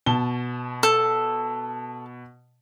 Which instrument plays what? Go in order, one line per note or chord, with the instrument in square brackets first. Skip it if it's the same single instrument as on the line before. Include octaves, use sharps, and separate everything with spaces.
[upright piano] B2 A5 G7
[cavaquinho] A4